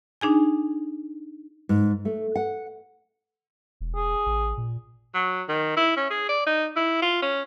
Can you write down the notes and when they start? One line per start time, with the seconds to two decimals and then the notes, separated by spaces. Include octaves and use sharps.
0.21 D4 D#4 G#4 G#5
1.69 G#2
2.05 A3
2.35 F#5
3.81 E1
3.96 G#4
4.26 A1
4.57 A#2
5.14 F#3
5.49 D#3
5.77 E4
5.97 C#4
6.10 G#4
6.29 D5
6.46 D#4
6.76 E4
7.02 F4
7.22 C#4